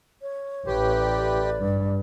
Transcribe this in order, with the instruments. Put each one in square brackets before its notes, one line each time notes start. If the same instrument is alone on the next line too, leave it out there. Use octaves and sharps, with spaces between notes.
[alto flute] C#5
[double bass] A1 [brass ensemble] A3 A4 B4 [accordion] G4
[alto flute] D5
[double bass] G2